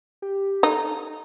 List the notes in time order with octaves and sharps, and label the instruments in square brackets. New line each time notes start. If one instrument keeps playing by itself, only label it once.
[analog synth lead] G4
[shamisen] D#4 [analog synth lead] A4